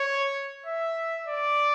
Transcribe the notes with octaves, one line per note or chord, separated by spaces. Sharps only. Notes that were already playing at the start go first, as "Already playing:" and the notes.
Already playing: C#5
E5
D5